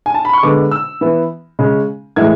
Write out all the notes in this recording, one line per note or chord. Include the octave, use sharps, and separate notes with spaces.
G#5
A5
B5
C#6
D3 G#3 B3 D6
E6
E3 B3
C#3 G#3 C#4
A2 E3 G#3 G#6